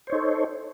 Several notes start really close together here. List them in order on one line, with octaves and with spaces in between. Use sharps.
C5 C#5 D#4 A4